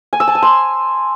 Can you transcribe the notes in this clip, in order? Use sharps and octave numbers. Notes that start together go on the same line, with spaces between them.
G#5
E6
A5
G#5
C6